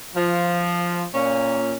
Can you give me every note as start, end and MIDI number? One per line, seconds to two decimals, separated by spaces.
0.16 1.04 53
1.14 1.74 46
1.14 1.74 61